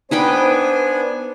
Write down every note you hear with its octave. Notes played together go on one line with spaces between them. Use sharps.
B3 D4 D#4 B4 C5 G5 G#5